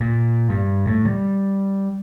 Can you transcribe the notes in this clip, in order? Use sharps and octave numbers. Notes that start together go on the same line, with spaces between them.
A#2
G2
A2
G3